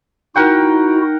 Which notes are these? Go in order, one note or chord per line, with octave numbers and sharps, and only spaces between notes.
D#4 E4 F#4 A#4 F#5 G5